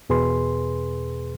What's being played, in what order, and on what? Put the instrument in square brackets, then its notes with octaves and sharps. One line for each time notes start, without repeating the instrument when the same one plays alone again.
[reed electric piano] E2 B2 G#4 B4 C6